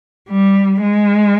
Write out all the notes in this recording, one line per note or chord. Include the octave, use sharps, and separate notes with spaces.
G3
G#3